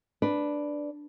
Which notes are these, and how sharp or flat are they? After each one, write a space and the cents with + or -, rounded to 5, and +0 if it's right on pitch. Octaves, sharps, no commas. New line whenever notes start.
D4 +0 B4 +0